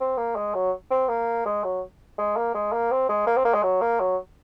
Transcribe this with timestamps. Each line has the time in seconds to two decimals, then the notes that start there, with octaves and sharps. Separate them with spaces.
0.01 C4
0.18 A#3
0.36 G#3
0.55 F#3
0.90 C4
1.09 A#3
1.46 G#3
1.64 F#3
2.18 G#3
2.37 A#3
2.54 G#3
2.72 A#3
2.91 C4
3.09 G#3
3.27 A#3
3.37 C4
3.45 A#3
3.54 G#3
3.63 F#3
3.81 A#3
4.00 F#3